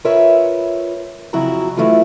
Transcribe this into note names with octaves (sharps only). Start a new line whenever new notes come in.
F4 A#4 B4 C#5 E5
F2 C#3 F#3 E4 F#4 A#5
E3 F#3 A3 E4 F4